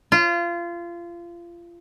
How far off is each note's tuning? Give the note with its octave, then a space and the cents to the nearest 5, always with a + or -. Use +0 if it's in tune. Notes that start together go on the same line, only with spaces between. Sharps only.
F4 -25